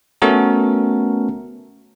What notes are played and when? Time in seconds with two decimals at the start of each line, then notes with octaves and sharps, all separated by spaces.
0.22 A3 B3 C#4 F#4 A4 A#4